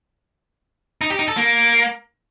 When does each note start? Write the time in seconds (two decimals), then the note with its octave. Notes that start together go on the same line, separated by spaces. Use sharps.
1.01 D#4
1.10 G4
1.19 D#4
1.28 A4
1.37 A#3